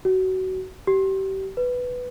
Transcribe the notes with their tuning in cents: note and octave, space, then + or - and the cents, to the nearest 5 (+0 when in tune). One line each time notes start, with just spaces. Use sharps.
F#4 +20
G4 -30
B4 +5